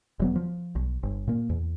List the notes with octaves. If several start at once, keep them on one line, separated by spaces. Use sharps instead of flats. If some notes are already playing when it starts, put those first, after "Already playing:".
E1 F#3 B3
F3
B1
G1
A#2 A#3
E2